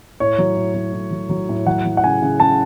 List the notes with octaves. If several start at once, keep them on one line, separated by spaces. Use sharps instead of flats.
A2 C#5
F#3
A2
F#3
A2
F#3
F#3
A2
F#3 F#5
F#3
F#5
C#3 G#5
C#3
C#3 A5